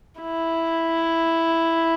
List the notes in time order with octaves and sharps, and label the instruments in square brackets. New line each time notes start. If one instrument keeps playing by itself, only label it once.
[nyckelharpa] E4